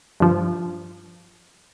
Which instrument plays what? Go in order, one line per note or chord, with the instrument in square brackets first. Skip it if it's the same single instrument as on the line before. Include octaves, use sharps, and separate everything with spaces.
[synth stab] G2 F3